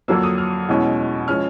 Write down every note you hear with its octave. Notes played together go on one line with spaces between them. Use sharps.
F2 D3 F#3 A#3 E6
D#6
F6
E2 B2 G#3 C#4
F3 G#3 C#4 F6